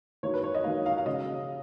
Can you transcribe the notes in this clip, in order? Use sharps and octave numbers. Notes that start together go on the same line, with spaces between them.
D#3 F#3 A#3 D#4 C#5
B4
C#5
D#5
D#3 F#3 A#3 D#4 F5
F5
F5
C#3 F#3 C#4 D#5